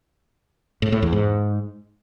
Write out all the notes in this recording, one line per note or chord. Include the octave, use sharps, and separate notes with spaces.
A2
A2
E2
G#2